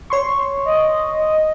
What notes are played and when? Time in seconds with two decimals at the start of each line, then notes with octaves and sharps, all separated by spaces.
0.10 C#5 C6 C#6
0.65 D#5